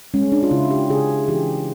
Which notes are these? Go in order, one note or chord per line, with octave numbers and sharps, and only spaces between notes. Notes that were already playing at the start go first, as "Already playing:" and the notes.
G#3 C#4
D4
F4
C#3 E4
G4
C#3 G#4
E3 G4